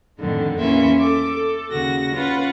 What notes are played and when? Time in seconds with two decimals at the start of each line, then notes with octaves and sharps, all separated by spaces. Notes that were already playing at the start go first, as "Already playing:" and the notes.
0.19 F2 A2 D3 D#3
0.59 E2 E3 A#3 C#4 E5 C6
1.00 A4 D6
1.36 A4
1.71 D#2 C#3 F#4 A#6
2.13 C#4 F4 B4 F#5